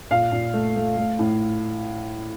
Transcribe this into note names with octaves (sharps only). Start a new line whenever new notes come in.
A#2 F5
A#2
A3
A3
A3
A2